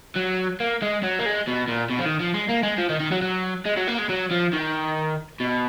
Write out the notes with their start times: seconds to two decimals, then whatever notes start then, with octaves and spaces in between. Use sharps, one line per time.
0.16 F#3
0.60 A#3
0.82 G#3
1.03 F#3
1.19 A#3
1.26 G#3
1.48 B2
1.68 A#2
1.90 B2
1.99 F3
2.06 D#3
2.21 F3
2.34 G#3
2.49 A#3
2.63 G#3
2.78 F3
2.90 D#3
3.00 D#3
3.12 F#3
3.22 F#3
3.65 G#3
3.77 F#3
3.87 A#3
3.98 G#3
4.09 F#3
4.31 F3
4.53 D#3
5.40 B2